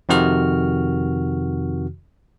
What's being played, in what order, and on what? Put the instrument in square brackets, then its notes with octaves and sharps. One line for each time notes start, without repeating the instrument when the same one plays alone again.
[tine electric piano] F2 C3 D#3 F#4 F6